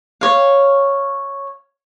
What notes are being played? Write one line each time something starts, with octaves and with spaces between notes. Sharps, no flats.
C#5 F5